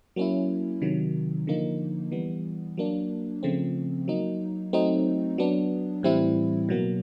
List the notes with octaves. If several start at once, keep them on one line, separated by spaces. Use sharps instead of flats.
F#3 A#3 C#4 E4
C3 D#3 F#3
D3 F3 A#3 D#4
E3 G3 B3
F#3 A#3 D4
C#3 F3 A3 C4
F#3 A#3 D#4
F#3 A3 C4 D#4
F#3 B3 D4
A2 E3 G3 C4 E4
B2 F#3 A#3